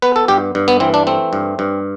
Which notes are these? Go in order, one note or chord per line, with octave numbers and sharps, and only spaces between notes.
B3 B4
A4
G2 G4
G2
B3
E3 C4
D4
A3 C4
G2
G2